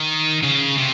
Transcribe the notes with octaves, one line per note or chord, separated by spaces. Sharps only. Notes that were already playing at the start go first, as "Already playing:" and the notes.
Already playing: D#3
C#3
C3